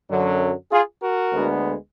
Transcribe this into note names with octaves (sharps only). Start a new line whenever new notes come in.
F#2 D3 F#3
F4 G#4
F#4 A#4
D2 D3 G#3 B3